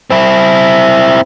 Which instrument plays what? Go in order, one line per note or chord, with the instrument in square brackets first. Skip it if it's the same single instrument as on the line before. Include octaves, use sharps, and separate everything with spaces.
[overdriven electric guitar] C4 E4